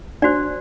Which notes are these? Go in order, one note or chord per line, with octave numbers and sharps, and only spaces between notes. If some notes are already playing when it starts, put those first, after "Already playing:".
D4 F#4 C5 D5